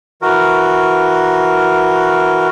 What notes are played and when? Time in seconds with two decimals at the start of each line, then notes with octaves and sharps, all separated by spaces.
0.22 E3 F#4 A#4